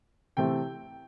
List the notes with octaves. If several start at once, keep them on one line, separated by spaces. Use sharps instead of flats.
C3 E3 A3 C4 G5